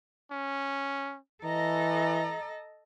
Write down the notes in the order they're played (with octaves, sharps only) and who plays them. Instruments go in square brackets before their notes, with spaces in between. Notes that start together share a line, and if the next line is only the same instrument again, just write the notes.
[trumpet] C#4
[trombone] E3 [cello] A4 D#5 [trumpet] A#5